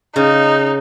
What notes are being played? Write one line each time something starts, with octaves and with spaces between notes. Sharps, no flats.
C#3 D#4